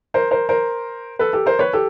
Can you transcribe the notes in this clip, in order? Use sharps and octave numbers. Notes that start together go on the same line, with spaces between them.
A#4 C5
A#4 C5
A#4 C5
A4 B4
G4 A4
A#4 C5
B4 C#5
G4 A4